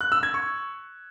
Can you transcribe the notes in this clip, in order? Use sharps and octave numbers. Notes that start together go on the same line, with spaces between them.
F#6
E6
G#6
C#6